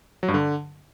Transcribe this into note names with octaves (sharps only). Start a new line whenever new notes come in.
F#3
G2
D3